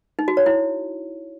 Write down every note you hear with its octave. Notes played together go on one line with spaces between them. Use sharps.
D#4
F#4
C#5
E4